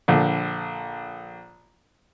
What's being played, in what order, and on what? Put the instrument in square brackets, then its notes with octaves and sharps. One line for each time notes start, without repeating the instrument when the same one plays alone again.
[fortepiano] A#1 D3